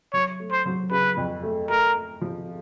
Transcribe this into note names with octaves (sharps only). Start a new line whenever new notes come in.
F#3 C#5
A3
C5
F#3
C#3 B4
F2
A3
A3 A#4
A3
F3